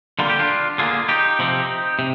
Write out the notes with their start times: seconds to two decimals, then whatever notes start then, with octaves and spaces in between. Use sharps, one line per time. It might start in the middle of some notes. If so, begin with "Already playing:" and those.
0.19 D3 G3 A#3 F4
0.30 G4
0.39 D4 F4
0.78 D3 G3 A#3 F4 G#4
1.08 D#4 G4
1.39 C3 F3 C4
1.99 C3